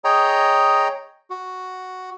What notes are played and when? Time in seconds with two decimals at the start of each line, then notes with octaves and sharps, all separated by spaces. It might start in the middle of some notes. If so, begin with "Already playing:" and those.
0.04 G#4 C#5 D#5 G5 A#5
1.30 F#4